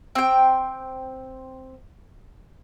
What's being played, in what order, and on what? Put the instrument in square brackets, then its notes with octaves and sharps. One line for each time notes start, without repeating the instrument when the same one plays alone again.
[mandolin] C4 G5